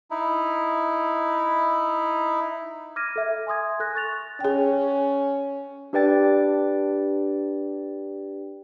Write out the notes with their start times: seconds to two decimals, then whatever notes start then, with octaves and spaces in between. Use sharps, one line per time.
0.11 D#4 E4
2.96 D6 F6 G#6 A#6 D#7
3.16 A4 E5
3.47 G#5 C6 D#6 G#6
3.80 A4 F#6 A#6
3.95 C#6 A6 F7
4.40 C#4 G#4 G5
5.93 D4 G4 B4 D5 G5 A6